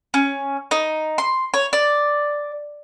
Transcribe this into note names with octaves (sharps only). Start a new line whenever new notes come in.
C#4
D#4
C6
C#5
D5